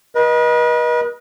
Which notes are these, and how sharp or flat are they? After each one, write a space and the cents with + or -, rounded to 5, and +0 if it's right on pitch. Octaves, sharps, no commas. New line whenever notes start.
B4 -40 D#5 +0